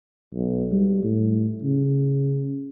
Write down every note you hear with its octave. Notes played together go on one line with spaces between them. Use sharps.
B1
G3
A2
C#3